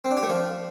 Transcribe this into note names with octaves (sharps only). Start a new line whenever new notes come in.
C4
D4
G4
A3
F3